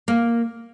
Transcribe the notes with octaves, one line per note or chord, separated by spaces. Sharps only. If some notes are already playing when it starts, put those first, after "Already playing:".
A#3